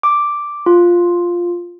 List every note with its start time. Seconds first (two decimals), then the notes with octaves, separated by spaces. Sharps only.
0.03 D6
0.66 F4